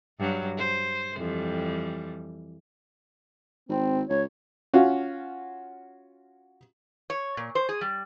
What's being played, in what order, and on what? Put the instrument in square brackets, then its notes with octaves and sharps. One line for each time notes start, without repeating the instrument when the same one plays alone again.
[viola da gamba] G2 F#3
C5
F2 E3 G3
[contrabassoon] G#1 [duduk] C4
[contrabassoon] C#2 [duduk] C#5
[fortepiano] C#4 F4 F#4
[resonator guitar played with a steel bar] C#5
A#2
C5
G#4
G3